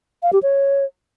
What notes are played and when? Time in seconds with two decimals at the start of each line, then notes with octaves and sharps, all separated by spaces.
0.23 F5
0.33 G4
0.42 C#5